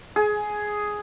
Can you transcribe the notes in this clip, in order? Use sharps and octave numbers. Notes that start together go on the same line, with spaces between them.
G#4